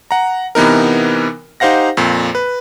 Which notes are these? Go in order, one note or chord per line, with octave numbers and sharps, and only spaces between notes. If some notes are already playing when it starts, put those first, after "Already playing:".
F#5 A#5
C3 E3 B3 D#4 A#4
D#4 G4 C5 F5 F#5 A#6
F2 A#2
B4